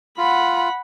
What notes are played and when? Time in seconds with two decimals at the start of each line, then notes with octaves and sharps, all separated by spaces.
0.18 F4 F#5 B5